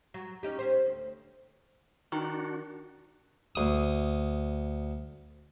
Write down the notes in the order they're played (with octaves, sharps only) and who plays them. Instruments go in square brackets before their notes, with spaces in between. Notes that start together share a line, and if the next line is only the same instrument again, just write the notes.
[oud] F#3
C#4 D#4 G4
C#4 G4 C5
D2
[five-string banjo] D#3 [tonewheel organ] D4 F#4
[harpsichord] D2 D#6